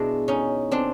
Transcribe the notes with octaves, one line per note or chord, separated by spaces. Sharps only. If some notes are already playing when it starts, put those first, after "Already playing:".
Already playing: B2 G#3 D4 E4
C#4 D#4
C4 D4